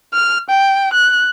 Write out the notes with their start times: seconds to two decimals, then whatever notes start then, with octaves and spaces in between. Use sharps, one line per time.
0.14 F6
0.50 G5
0.93 F#6